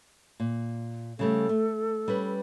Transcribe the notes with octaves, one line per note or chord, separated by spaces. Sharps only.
A#2
C#3 G3 A3 A4
A3
G3 C#4 B4